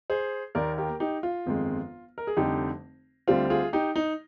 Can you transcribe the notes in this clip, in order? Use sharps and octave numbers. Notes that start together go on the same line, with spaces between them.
G#4 C5
D#2 D#3 A#3 A#4 D5
G4 A#4
D#4 G4
F4
G1 F2 D#3 G#3
A#4
G#4
F1 F2 D3 G3 D#4 G4
D2 D3 G3 C4 F4
F4 G#4
D#4 G4
D#4